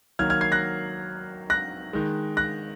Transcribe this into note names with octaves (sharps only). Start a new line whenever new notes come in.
D#3 F#3 A#3 F6 G#6
F6 G#6
G#6 C7
F#6 A#6
F#6 A#6
D#3 G#3
F#6 A#6